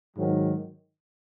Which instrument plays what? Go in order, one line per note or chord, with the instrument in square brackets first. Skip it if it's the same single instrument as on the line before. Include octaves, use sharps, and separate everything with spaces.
[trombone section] G#2 D#3 F#3